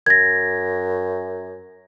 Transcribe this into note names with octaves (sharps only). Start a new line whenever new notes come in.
F#2 G#6 A#6